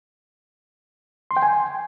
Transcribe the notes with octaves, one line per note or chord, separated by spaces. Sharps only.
C6
G5
G#5